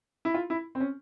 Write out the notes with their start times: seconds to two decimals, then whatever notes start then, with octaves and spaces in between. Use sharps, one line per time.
0.25 E4
0.34 F4
0.50 E4
0.75 C4
0.80 C#4